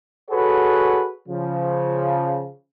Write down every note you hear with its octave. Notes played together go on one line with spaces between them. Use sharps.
F#4 G#4 A4 B4 C#5 F#5
C#3 F3